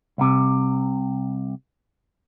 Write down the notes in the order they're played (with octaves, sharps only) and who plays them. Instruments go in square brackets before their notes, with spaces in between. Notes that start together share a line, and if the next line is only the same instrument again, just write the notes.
[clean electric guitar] C2 C3